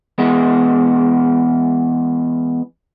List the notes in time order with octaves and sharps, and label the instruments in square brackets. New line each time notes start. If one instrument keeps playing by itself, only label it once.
[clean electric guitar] E2 G#3 B3